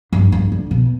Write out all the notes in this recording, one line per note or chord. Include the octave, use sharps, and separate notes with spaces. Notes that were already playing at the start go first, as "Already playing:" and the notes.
G2
G2
D3
B2